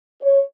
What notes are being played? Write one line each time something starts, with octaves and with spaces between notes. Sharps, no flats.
C#5